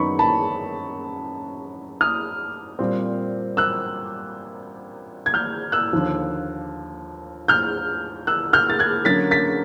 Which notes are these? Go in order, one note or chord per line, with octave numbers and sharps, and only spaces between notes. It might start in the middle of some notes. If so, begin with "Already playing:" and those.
Already playing: F#2 D#3 F#3 B3 D#4 B5 C#6
A5 B5
D#6 F6
A#2 G3 C4
E6 F#6
G#6
F6 G6
E6 F#6
D#2 D3 F3
F6 G6
E6 F#6
F6 G6
A6
F#6 G#6
D3 F#3 A#3 C#4 A6 B6
A6 B6